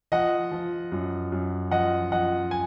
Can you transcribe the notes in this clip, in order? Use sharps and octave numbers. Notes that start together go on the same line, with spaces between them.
F3 D#5 F#5
F3
F#2
F#2
F3 D#5 F#5
F3 D#5 F#5
G#5